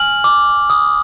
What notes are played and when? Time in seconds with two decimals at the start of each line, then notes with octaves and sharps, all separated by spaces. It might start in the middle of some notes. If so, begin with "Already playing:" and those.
Already playing: G#5 F6 F#7
0.24 D6
0.70 D#6